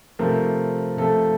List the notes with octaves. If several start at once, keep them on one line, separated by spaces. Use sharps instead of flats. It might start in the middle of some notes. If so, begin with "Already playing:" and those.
C3 F3 A3 A#4
C3 F3 A3 A4